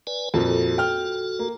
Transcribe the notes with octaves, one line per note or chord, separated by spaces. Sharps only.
B4 D5 G#5
F2 A#2 F#4 A4
G5 F6
A#3